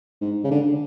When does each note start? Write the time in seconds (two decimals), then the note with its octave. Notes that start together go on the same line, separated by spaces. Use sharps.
0.21 G#2
0.44 C#3
0.51 D3